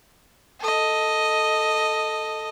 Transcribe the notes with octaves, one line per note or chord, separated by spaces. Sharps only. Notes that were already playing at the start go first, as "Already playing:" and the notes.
A4 D#5